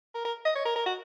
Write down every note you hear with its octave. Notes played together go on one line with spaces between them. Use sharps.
A#4
A#4
D#5
C#5
A#4
A#4
F#4